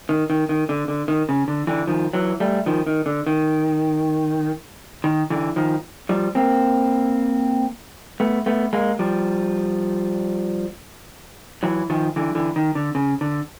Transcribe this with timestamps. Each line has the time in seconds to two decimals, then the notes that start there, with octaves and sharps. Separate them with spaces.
0.09 D#3
0.30 D#3
0.49 D#3
0.69 D3
0.88 D3
1.08 D#3
1.29 C#3
1.48 D3
1.67 D3 E3
1.88 D#3 F3
2.13 E3 F#3
2.40 G3 A3
2.66 D#3 F3
2.87 D#3
3.06 D3
3.27 D#3
5.04 D#3
5.30 D3 E3
5.56 D#3 F3
6.09 F3 G3
6.35 A#3 C4
8.20 A3 B3
8.46 A3 B3
8.73 G#3 A#3
8.99 F3 G3
11.63 E3 F#3
11.90 D#3 F3
12.16 D3 E3
12.35 D3 E3
12.56 D#3
12.75 D3
12.95 C#3
13.21 D3